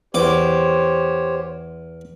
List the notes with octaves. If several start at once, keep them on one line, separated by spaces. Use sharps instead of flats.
E2 G4 C5 C#5 D6